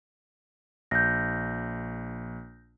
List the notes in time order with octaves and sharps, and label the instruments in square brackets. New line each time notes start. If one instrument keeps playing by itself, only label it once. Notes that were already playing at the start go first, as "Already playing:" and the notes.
[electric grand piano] A#1 [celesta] G6 A#6